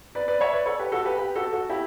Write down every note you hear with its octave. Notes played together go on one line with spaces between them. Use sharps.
B4 D5
B4 D5
C#5 E5
B4 D5
A4 C#5
G4 B4
F#4 A4
G4 B4
G4 B4
F#4 A4
F#4 A4
E4 G4